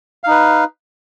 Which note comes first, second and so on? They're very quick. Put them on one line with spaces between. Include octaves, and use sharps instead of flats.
F5 D#4 B4